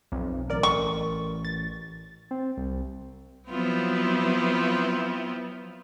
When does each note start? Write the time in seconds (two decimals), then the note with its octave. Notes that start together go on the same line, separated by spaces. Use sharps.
0.12 B1 F2
0.50 A1 A#4 D5
0.63 C#6
1.45 A6
2.31 C4
2.58 C2
3.49 F3 F#3 B3 C4 E4 F4